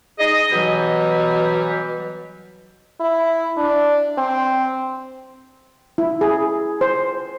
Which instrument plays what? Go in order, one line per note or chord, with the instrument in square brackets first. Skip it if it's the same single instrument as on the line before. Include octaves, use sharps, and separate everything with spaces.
[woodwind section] D#4 G#4 D#5
B2 E3 F#3 G3
[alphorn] E4
D4
C4
[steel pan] E4
G#4
C5